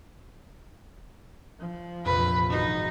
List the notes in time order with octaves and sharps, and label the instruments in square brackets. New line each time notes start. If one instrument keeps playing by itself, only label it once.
[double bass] F3
[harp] F1 A#1 F2 [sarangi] B4
[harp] G#1 F#4 A#4 [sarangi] D#4